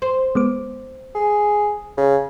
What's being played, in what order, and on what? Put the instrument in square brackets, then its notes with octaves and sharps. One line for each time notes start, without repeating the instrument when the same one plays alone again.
[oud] C5
[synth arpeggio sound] G#3 B3 D6
[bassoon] G#4
C#3